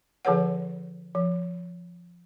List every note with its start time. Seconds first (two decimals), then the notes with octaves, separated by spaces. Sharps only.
0.25 D3 F3 G#4 B4 C#5 F#5
1.15 F3